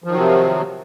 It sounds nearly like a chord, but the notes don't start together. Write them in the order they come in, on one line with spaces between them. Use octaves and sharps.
F3 D#3 F#3 C3